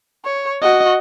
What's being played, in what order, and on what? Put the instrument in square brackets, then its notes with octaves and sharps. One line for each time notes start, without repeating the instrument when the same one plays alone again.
[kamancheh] C#5
[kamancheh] F#4 [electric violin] D#5